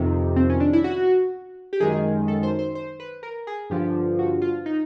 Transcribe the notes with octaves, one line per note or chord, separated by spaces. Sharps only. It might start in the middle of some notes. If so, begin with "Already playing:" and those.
Already playing: F2 C3 D#3
C4
C#4
D4
E4
F#4
G4
F#2 D#3 G#3 G#4
A4
C5
C5
C5
B4
A#4
G#4
G2 D3 F3 G4
F#4
F4
D#4